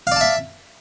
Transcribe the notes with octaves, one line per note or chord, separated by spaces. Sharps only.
D5 E5 F5 A5